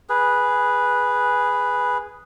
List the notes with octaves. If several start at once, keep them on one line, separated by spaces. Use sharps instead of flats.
G#4 B4